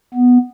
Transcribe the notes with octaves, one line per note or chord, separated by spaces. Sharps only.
B3